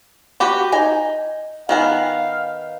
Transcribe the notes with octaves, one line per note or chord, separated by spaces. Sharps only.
F#4 G4 B4
D#4 G#5
D#3 B3 F5 G#5